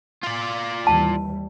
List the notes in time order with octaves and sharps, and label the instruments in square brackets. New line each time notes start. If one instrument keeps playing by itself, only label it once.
[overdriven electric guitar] F4 D5
[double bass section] D#2 E3 G3 [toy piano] A5